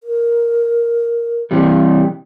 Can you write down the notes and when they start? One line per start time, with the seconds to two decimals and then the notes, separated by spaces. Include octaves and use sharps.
0.04 A#4
1.51 C3 E3 G3